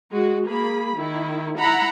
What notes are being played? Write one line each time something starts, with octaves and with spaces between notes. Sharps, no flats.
G#3 F#4
A#3 G#4 B5
D#3 E4
E4 F#5 A#5 B5